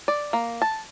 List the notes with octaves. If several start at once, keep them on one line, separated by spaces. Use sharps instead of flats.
D5
A#3
A5